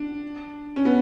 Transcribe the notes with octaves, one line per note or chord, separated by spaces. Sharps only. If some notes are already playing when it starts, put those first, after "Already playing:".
Already playing: D4
C#4
B3